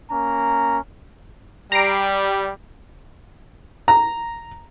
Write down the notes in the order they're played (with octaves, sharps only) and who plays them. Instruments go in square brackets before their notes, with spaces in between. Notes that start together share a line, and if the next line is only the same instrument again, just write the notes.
[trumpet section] A#3 C#4 A#5
[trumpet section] G3 [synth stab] A#5 C7 D7
[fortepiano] A#5